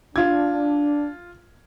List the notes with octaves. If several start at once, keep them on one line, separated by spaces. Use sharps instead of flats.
D4 F4 G#6